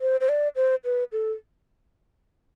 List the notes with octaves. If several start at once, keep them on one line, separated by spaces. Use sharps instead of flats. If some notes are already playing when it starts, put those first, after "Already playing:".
C5
C5
D5
C5
B4
A4